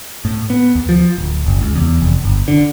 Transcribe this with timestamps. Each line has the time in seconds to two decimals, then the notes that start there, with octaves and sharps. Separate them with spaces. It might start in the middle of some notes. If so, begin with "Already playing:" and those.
0.25 A2
0.50 B3
0.75 D#2
0.89 F3
1.18 D1
1.46 F#1
1.62 C#2
1.76 E2
2.00 F1
2.24 G1
2.48 D3